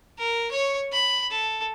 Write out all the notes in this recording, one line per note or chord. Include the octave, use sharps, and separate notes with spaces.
A#4
C#5 C#6
B5
A4